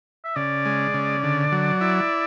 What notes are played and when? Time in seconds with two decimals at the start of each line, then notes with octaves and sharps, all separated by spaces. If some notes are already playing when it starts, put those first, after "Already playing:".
0.25 E5
0.36 C#3 D5
0.65 G#3
0.94 C#3
1.23 D3
1.52 F#3
1.81 E4